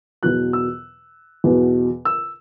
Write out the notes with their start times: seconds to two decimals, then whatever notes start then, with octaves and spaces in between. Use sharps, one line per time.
0.22 E2 B2 F#3 F#6
0.53 E6
1.44 E2 B2 F#3
2.05 E6